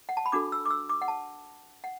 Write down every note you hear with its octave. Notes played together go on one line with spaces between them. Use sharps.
F#5
A5
B5
D4 F#4 A4 D6
E6
D6
E6
D6
F#5
A5
F#5